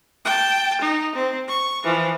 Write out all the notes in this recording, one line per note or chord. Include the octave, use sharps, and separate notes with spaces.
G5 A5
D#4
C4
C#6
E3 F3